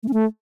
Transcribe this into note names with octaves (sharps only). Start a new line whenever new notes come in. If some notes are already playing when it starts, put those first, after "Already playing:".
A3
C#4
A3